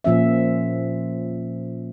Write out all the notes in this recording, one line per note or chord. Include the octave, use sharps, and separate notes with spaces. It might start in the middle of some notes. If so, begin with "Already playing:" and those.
A#2 F3 C#4 E5